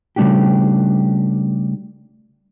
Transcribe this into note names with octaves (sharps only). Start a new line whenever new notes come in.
C#3 G3 A3 D4 F#4 G4